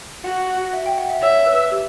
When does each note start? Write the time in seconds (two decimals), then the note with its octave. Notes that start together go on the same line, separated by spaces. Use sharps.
0.24 F#4 F#5
0.73 E5
0.86 G5
0.98 F#5
1.10 E5
1.22 C#5 E5
1.39 C#5
1.46 B4
1.72 G4